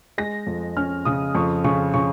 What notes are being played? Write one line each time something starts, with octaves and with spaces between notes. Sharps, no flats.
G#3 A#6
F2
C#4 F6
C#3 D#6
F2 C#6
C#3 C#6
C#3 C#6